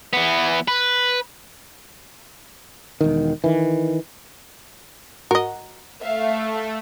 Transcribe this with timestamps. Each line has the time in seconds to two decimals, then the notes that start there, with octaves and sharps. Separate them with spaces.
0.13 E3 B3
0.68 B4
3.01 E1 D#3
3.44 D#3 E3
5.31 G#2 F#4 A#4 D#5 F#5
6.02 A3 E5 F5